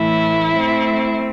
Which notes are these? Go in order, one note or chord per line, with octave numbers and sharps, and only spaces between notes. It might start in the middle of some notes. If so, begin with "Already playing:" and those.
Already playing: A2 E3 A3 E4
A3 C4